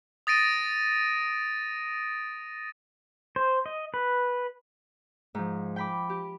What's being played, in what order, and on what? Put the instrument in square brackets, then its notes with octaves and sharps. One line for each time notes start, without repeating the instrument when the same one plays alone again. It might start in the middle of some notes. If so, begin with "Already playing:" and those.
[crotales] D#6 A6 A#6 D7 D#7
[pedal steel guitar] C5
D#5
B4
[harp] G#2 F3
G5 B5 D6
G4